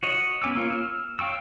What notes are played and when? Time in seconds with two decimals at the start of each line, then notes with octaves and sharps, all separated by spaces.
0.03 F#4 C#5 D#5
0.42 B3 C#4 G#5 D6 E6
0.55 A#3 F4 C#5
0.70 E6 F6
1.19 C#5 F5 G5 C#6 E6